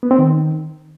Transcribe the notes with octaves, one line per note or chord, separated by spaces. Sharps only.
B3
C4
D#3